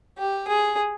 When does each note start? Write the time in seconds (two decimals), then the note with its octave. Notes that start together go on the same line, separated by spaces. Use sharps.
0.18 G4
0.47 G#4